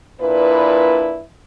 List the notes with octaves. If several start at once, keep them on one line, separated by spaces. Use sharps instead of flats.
A#2 D4 E4 B4